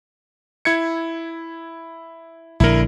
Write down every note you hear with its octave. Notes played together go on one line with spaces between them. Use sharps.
E4 G#6 C#7
A#1 D3 E4 A#4